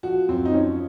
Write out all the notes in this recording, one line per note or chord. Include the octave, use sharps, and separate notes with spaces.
F3 F#4
F#2 C4
D#4
F3 C#4